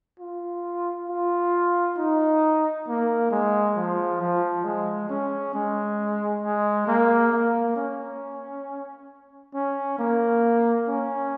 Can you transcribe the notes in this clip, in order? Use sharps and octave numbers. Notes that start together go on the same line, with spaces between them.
F4
F4
D#4
A#3
G#3
F3
F3
G#3
C#4
G#3
G#3
A#3
A#3
C#4
C#4
A#3
C#4